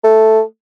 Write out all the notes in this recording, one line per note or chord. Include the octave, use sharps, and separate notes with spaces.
A3